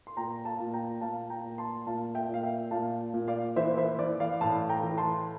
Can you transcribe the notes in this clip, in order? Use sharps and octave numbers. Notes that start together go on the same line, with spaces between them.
C6
A#2 G5 A#5
F5 A5
A#2
G5 A#5
A#2 F5 A5
G5 A#5
A#2
A5 C6
A#2 F5 A5
E5 G5
A#2 F5
E5 G5
A#2 F5 A5
A#2
D5 F5
E3 C5 E5
C5 E5
E3 D5
D5 F5
A2 F5 A5
G5 A#5
E3
A5 C6